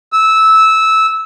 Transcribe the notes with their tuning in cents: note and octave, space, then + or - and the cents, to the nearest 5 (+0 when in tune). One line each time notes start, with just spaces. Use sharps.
E6 -15